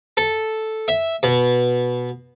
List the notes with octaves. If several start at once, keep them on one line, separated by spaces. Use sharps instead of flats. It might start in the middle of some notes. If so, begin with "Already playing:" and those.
A4
E5
B2